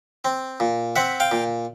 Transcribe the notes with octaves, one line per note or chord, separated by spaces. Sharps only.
C4
A#2
C4 E5 F#5
F5 G5
A#2